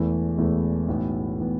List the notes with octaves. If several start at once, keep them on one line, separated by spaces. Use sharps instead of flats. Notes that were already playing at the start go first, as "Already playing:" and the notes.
Already playing: E1 E2 E3 A3 E4
E1 E2 E3 A3 E4
B1 A2 E3 B3
A2 E3 B3